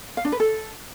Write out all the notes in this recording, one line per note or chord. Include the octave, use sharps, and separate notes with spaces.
F5
D4
B4
A4